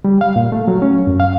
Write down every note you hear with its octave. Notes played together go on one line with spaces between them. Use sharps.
G3
F5
A#2
A3
F#3
C#4
F#2
F5